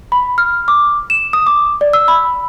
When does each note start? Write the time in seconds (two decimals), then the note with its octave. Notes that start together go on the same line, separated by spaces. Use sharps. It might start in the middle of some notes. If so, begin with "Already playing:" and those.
0.12 B5
0.38 F6
0.68 D6
1.10 E7
1.33 D#6
1.47 D6
1.81 D5
1.93 E6
2.08 B5